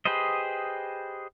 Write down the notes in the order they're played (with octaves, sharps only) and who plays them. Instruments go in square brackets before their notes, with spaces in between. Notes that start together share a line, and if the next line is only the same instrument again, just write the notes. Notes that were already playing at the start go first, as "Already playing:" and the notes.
[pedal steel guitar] G4 G#4 B4 C5 D#5